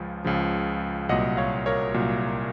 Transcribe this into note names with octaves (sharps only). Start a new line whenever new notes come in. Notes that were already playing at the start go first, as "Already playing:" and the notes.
Already playing: C#2 C#3 F3
C#2 C#3 F3
C2 A#2 F#3 D#5 F#5
C#5 F5
A#4 C#5
C2 A#2 F#3